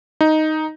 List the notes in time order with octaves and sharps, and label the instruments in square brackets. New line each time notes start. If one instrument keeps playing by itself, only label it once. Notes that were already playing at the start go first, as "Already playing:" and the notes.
[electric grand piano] D#4